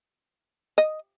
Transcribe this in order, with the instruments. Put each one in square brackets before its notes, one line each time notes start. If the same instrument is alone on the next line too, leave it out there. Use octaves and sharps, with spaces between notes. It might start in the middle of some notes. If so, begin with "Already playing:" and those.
[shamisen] D#5